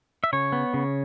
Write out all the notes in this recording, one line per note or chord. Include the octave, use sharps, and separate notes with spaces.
E5
C#3 C#5
B3
C#3